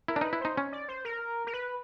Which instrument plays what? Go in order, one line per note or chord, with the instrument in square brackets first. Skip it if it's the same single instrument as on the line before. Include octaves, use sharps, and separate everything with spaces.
[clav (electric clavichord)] E4 [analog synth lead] A#4
[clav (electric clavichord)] D4
[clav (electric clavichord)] D#4 [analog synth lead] B4
[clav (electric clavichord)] E4
[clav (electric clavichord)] D#4 [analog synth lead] C5
[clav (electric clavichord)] C#4
[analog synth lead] D5
C5
A#4
A#4
B4